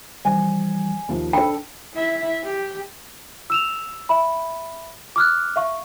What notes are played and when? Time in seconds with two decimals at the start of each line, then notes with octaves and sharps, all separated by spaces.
0.25 E3 F3 G3 C5 G#5
1.09 D#2 F3
1.33 D4 A4 G5 B5
1.94 E4 E5
2.44 G4
3.50 E6 E7 F7
4.09 E5 B5
5.16 D6 F6 F#6
5.56 E5 F5 C#6